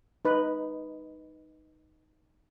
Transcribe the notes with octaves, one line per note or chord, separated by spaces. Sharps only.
D#4 B4